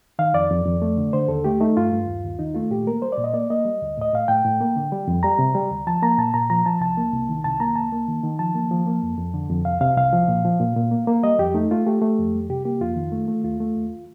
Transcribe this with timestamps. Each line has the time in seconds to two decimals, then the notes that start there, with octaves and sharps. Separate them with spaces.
0.19 D#3 F5
0.34 F2 D5
0.51 F2
0.65 F2
0.82 A3
0.97 D3
1.13 D3 C5
1.28 D#2 A4
1.44 A3 G4
1.60 A3 D#4
1.77 G2 F4
1.92 G2
2.07 D#2
2.24 D#2
2.39 D#3 D#4
2.55 A3 F4
2.70 A#2 G4
2.87 A#3 A#4
3.02 G3 C5
3.12 D5
3.18 A#2
3.24 D#5
3.34 A#3 D5
3.50 A#3 D#5
3.65 G3
3.82 D2
3.98 A2 D#5
4.13 A2 F5
4.28 A2 G5
4.45 A2
4.61 A#3
4.76 D3
4.92 G3
5.07 F2
5.23 G3 A#5
5.39 C3
5.55 G3
5.71 D2
5.87 F3 A5
6.03 A#3 A#5
6.18 A#2 A5
6.34 A#2 A#5
6.50 F3 A#5
6.66 F3 A5
6.81 C2 A5
6.97 A#3
7.12 C2
7.29 D#3
7.44 C2 A5
7.60 A#3 A#5
7.75 C2 A5
7.92 A#3
8.08 D#3
8.23 D#3
8.39 F3 A5
8.55 A#3
8.71 F3
8.87 A#3
9.03 F2
9.18 F2
9.34 D3
9.50 F2
9.65 C2 F5
9.81 C3 F5
9.96 C2 F5
10.13 F3
10.28 A#2
10.45 F3
10.60 A#2
10.76 A#2
10.91 A#3
11.07 A#3
11.23 G3 D#5
11.39 F2 G4
11.54 A3 D#4
11.71 A3 F4
11.86 A3 G4
12.02 A3
12.18 F2
12.34 G3
12.49 C3 G4
12.65 A#3 G4
12.81 F2 F4
12.96 D#3
13.12 A3
13.28 A3
13.44 D#2 F4
13.60 A3
13.76 D#2